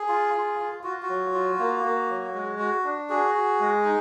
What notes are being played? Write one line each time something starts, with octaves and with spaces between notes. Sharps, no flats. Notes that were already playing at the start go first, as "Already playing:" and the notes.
Already playing: G#4
F4
F4
F4
F4 F#4
F#4
F#3
F4
A#3
A#3
F#3
G#3
F#4
D4
F#4 G#4
F#4
G#3
D#4